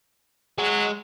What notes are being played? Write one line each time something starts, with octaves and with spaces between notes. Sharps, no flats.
F#3 G#3